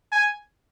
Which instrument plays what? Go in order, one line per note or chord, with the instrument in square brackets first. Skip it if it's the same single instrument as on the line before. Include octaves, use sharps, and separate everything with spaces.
[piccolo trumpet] G#5